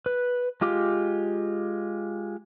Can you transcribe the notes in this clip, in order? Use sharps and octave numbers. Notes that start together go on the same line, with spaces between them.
B4
G#3 F4 G4 D6